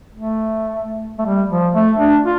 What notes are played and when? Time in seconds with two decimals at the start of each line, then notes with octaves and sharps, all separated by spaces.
0.15 A3
1.18 A3
1.25 G3
1.50 F3
1.75 A3
1.98 D4
2.24 F4